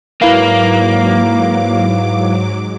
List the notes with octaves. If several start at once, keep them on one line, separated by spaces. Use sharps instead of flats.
G#2 F#3 A#3 E4 B4 F5 D6